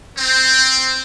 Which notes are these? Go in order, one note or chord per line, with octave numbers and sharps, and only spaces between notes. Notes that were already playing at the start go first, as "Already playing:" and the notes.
C4